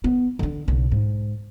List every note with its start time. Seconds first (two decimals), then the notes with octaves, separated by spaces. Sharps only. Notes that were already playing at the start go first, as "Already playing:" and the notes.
0.04 B3
0.39 D3 D4
0.68 B1 C#3
0.92 G#2